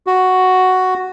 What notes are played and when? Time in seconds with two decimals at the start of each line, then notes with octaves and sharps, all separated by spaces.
0.07 F#4